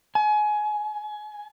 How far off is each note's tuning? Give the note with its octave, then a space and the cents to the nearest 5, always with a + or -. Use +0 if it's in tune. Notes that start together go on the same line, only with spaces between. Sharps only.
G#5 +25